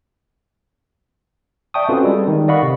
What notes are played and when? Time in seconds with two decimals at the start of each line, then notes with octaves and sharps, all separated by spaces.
1.74 D5 E5 G5 A5 C#6 D#6
1.89 C4 C#4 F4 F#4 A4 B4
2.04 G3 G#3 A4
2.28 D#3
2.48 D5 D#5 F5 F#5 B5 C#6
2.63 C3